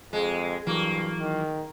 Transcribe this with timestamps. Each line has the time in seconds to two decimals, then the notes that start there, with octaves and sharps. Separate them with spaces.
0.13 F2 G#3
0.67 G2 E3 F#3 A#3
1.19 D#3